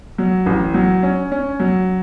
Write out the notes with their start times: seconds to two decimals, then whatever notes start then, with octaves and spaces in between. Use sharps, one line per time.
0.18 F#3
0.46 A1
0.74 F#3
1.03 C#4
1.32 C#4
1.60 F#3